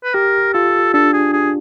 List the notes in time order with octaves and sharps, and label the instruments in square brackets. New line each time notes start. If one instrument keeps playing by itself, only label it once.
[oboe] B4
[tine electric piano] G4 [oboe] A#4
[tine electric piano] F4 [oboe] A4
[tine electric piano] D4 [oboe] A4
[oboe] G#4
G#4